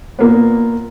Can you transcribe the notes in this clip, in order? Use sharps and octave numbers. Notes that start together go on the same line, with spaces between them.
A#2 A#3 B3